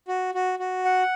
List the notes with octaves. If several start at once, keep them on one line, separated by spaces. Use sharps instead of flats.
F#4
F#4
F#4
F#5